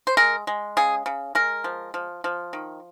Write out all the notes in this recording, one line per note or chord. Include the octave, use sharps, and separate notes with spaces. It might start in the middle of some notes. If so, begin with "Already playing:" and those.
C5
G#3 A#4
G#3
C#3 G#4
C#3
G#3 A#4
F3
F3
F3
D#3